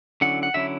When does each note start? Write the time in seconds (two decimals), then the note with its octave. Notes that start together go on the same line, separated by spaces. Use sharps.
0.21 D3 F#3 C#4 E4 F#5
0.43 F#5
0.54 D3 F#3 C#4 E4 E5